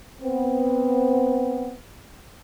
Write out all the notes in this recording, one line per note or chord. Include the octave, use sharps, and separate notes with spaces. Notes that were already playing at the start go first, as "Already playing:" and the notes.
B3 C4